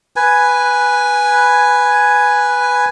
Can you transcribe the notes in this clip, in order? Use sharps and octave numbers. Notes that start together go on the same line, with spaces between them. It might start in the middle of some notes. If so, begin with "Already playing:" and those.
B4 G#5